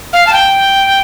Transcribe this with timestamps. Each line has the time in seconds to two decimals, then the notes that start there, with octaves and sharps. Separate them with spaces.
0.13 F5
0.26 A5
0.32 G5